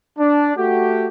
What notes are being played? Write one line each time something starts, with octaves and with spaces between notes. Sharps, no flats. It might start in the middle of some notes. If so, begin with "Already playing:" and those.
D4
A3 F#4 G4